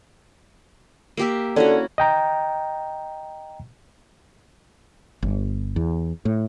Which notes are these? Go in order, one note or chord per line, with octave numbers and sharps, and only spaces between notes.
A#3 G4 E5
D3 C#4 E4 F#4
D#5 G5 A#5
G1
E2
A2